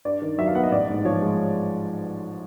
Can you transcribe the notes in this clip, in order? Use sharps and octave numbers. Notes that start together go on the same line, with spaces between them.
G2 D5
D#3
F#3 E5
F5
B3 F#5
D#5
A1 D5
G#2
F3 C#5
G#3